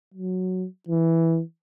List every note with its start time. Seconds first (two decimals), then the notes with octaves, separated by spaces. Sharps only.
0.14 F#3
0.89 E3